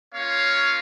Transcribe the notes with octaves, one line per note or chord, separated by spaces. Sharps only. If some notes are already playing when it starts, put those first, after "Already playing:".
A#3 C#4 F4 C#5 F5